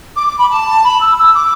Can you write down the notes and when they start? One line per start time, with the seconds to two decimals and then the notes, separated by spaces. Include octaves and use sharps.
0.16 D6
0.27 D6
0.38 B5
0.50 A5
0.84 B5
1.00 E6
1.17 E6
1.34 D6